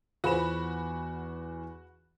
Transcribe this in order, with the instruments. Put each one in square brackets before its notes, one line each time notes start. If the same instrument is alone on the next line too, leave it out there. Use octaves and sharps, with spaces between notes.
[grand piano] E2 B3 E7 [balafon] F4 G#4 C5 [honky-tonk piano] F#4 B5